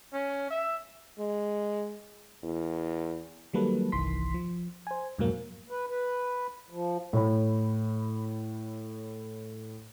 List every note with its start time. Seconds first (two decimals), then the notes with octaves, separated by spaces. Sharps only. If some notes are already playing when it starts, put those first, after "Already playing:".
0.13 C#4
0.50 E5
1.19 G#3
2.43 E2
3.53 D#3 F#3 G3 A#3 A4 B4
3.92 G1 C2 D#3 E3 C6 B6
4.34 F3
4.87 C5 G#5
5.19 F2 G#2 B2 F#3 A#3
5.70 B4
5.88 B4
6.70 F3
7.13 A2 C#5 B5